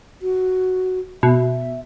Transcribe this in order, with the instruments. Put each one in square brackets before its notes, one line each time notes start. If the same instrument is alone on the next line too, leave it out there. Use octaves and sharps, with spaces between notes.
[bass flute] F#4
[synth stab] B2 [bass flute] E5